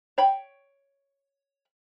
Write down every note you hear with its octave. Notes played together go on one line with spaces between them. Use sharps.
C#5 G5 B5